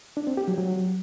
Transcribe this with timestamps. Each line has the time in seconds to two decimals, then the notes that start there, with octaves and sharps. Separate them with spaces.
0.17 D4
0.27 C4
0.37 G4
0.48 F#3
0.58 F#3